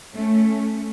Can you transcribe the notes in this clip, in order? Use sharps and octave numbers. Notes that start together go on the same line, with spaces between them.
A3 C#4